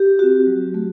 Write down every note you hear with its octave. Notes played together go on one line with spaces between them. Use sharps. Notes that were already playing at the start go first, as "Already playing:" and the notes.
Already playing: G4
C4 F#4
F#3
A3